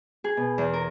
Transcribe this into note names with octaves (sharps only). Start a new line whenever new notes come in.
G#4
B2
E2
A#4